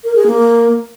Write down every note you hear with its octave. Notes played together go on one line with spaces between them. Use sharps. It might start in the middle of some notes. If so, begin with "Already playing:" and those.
A#4
G#4
A#3